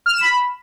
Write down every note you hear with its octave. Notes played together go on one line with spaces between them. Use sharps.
F6
E7
B5